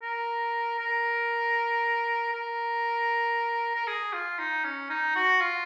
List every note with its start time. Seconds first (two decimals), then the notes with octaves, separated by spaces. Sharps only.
0.03 A#4
0.79 A#4
2.33 A#4
3.75 A#4
3.87 G#4
4.13 F4
4.39 D#4
4.64 C#4
4.89 D#4
5.15 F#4
5.41 F4